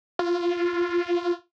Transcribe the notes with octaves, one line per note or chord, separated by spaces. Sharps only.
F4